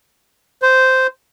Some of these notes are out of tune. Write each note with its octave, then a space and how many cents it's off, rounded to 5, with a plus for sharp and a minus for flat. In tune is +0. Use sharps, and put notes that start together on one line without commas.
C5 -10